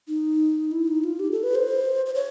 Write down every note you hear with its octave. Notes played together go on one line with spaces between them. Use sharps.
D#4
E4
D#4
F4
G4
A4
B4
C5
C5
C#5